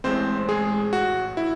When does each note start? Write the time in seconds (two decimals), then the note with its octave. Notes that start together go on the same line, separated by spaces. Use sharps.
0.04 A1 A2 G#3 C4 C5
0.49 G#3 G#4
0.93 F#4
1.37 E4